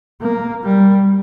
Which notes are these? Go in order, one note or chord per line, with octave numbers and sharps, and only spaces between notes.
A#3
G3